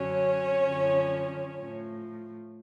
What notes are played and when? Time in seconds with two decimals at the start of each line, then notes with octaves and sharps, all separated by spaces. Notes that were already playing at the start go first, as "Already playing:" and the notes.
Already playing: F#2 D3 F#3 C#4 C#5
0.67 F#2 D3 F3
1.58 A2 F3